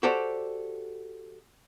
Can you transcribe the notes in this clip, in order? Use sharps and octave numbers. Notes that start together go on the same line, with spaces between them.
F#4 G4 A4 C5 D5